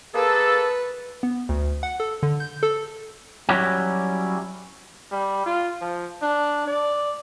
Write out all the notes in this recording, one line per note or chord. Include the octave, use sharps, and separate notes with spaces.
A#3 G#4 A4 B4
B3
D2
F#5
A4
D3
G6
A4
F#3 G3 C#4 E4 F#4 G4
G3
F4
F3
D4
D5